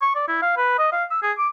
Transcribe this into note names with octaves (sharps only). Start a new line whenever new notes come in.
C#6
D5
E4
F5
B4
D#5
F5
E6
G#4
D6